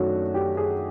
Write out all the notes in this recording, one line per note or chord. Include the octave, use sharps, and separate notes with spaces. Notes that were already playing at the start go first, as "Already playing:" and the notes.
Already playing: F#2 D#3 F#3 A3 C#4 D4 F#4
G4
G#4